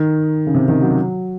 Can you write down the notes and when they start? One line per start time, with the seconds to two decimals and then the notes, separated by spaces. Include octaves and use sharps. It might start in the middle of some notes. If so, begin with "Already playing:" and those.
Already playing: D#3
0.47 C#3
0.54 C3
0.68 D#3
0.82 F#3